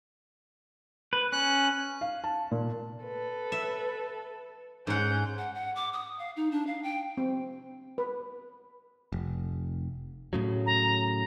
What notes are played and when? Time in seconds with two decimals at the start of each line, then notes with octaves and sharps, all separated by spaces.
1.13 B4
1.32 C#4 F#6
2.01 F5
2.24 A5
2.51 A#2
3.04 A4 B4
3.52 E5
4.87 G#2 C#4 F#5 G6
5.38 F#5
5.55 F#5
5.76 D6
5.93 D#6
6.19 F5
6.37 D#4
6.52 D4
6.67 F5
6.83 G5
7.17 C4
7.98 B4
9.12 F1
10.33 A2 C#3 F#3
10.66 A#5